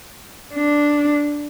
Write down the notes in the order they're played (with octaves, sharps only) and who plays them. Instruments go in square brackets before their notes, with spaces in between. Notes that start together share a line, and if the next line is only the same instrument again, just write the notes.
[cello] D4